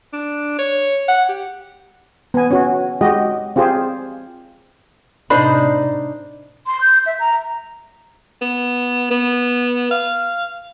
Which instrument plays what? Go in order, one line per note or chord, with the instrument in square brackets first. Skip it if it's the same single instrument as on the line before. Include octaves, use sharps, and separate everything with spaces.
[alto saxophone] D4
C#5
F#5
G4
[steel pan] B3 G#5
C#4 F#4
G#3 F#4 G4 D#5
C4 F4 G4 G#4 C5
[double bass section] A2 C3 [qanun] D4 D#4 C5 [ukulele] B5
[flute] C6
G6
E5
A#5
[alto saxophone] B3
B3
F5